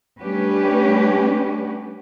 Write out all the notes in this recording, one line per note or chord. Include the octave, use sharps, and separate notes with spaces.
G3 A3 C#4 D4 G4 B4